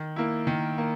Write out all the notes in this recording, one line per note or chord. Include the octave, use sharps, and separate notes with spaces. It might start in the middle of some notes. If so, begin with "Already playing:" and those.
Already playing: D#3
A#3 E4
D#3
A#3